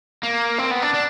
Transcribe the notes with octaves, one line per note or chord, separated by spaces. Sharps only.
A#3
C4
B3
D4
D4